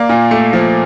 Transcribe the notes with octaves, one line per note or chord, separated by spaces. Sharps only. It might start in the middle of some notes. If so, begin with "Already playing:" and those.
Already playing: A#3 D5
A#2
A3
F3